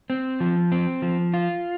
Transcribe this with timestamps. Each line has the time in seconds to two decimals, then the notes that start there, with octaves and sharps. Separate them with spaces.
0.10 C4
0.40 F3
0.72 C4
1.02 F3
1.34 F4